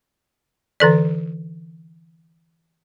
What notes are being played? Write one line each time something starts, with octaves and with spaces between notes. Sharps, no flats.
D3 E3 A4 D5